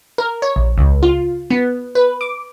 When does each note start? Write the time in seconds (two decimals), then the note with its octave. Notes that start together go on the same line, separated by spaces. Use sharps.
0.18 A#4
0.42 C#5
0.56 A#1
0.78 C#2
1.03 F4
1.50 B3
1.95 B4
2.21 D6